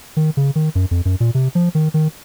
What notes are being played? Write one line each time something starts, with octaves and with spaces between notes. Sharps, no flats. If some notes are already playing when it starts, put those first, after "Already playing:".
D#3
C#3
D#3
F#2
F2
F#2
A#2
C3
F3
D#3
D#3